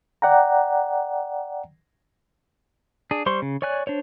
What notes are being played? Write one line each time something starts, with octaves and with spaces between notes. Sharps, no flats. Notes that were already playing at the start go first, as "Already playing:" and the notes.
D5 F#5 G5 A#5
D4 G#4
G3 C5 C6 C#6
C#3
C#5 D5 G#5 F#6
D4 C5 C#5